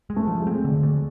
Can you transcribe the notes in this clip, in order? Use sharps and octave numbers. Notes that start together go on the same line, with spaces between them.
G#3
A3
F3
G#3
C4
D3
A3